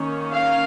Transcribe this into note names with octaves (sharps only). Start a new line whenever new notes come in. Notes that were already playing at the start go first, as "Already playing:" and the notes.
Already playing: D#3 A#3 C#4
F5